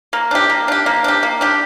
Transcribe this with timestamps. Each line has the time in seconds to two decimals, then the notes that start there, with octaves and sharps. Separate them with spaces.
0.13 A#3
0.31 D4 G4
0.50 A#3
0.68 D4 G4
0.86 A#3
1.04 D4 G4
1.23 A#3
1.41 D4 G4